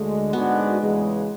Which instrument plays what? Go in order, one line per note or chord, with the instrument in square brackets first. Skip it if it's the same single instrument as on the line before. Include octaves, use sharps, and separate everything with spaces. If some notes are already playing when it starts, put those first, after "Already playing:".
Already playing: [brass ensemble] D2 D3 G#3 [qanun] A3
[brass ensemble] G#2 G#3 D4 F#4 [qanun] B3
[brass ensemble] E2 C#3 G#3